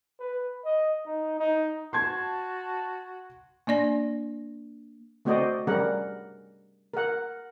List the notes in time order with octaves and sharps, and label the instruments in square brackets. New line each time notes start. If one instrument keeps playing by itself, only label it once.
[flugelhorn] B4
D#5
D#4
D#4
[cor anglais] F#4 [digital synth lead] A5 [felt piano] C6 G#6
[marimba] A#3 D4 D5 A#6
[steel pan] A3 C4 F#4 C5 D5 D#5
G3 C#4 A#4 F#5
A#4 F#5